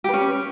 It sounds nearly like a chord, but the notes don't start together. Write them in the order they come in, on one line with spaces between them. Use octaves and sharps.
G4 B4 C#4